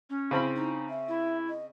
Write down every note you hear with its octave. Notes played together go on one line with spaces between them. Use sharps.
C#4
C#3 C4 E4 B5
D#4
E5
E4
D#5